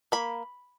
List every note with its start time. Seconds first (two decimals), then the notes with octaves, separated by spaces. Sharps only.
0.12 A#3 B5